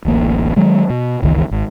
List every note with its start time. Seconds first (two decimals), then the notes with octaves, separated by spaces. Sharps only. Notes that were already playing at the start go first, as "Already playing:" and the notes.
0.05 D1 A1 A#3
0.56 D#3 F#3 G#3
0.90 B2
1.22 F#1 C#2 D#3 E3
1.51 G#1